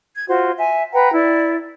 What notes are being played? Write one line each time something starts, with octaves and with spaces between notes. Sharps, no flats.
G#6
F4 F#4 C5
E5 G#5
B4 F#5 G5 A#5
E4 D5